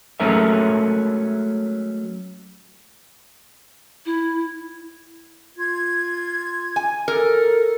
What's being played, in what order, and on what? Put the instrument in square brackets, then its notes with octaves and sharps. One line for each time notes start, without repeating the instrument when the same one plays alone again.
[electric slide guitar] F#3 G#3 A3 C#4 A#4 E5
[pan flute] E4
[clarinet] F4 [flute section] G#6
[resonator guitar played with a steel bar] G#5
[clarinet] A4 [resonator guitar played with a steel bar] A#4